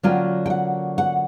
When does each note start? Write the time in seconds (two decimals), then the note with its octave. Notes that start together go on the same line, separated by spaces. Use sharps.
0.03 D3 F#3 A#3 C#4 F4 G5
0.46 G5
0.50 F#5
0.98 F#5